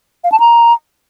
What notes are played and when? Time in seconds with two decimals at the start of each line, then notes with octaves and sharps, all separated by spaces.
0.24 F5
0.32 A5
0.40 A#5